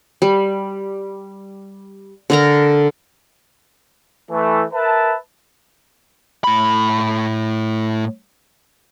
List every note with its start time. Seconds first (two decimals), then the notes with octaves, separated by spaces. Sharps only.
0.22 G3
2.30 D3 A#4 A#5
4.31 E3 A3
4.74 A#4 B4 E5 A5
6.44 A2 B5